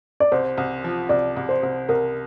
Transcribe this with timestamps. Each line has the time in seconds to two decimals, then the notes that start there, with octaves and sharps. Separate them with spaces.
0.20 D5
0.32 C2 C5
0.58 C2
0.84 F3
1.09 C2 D5
1.36 C2
1.49 C5
1.63 C2
1.89 C2 A#4